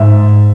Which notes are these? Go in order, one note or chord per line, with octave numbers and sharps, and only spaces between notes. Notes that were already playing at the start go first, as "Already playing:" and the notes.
Already playing: G#2 E5